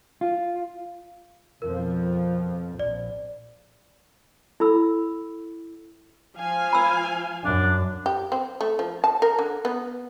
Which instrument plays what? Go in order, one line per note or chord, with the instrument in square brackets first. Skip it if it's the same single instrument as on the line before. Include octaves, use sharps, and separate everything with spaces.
[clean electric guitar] F4
[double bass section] F2 B2 F3 [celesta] A#4
[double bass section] A#1 [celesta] D5
[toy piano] E4 A4 B5 E6
[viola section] F3 F5 G#5
[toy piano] B5 E6
[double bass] F#2 [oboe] D4
[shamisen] G4
C4
A3
F3
A5
A#4
D3
B3